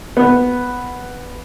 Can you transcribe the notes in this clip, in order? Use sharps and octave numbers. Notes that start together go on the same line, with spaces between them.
B3